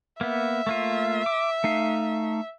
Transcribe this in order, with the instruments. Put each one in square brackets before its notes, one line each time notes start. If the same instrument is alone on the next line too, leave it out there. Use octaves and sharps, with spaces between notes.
[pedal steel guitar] A#3 B3 [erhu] E5
[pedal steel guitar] A3 A#3 F4
D6
A3 D#4 F5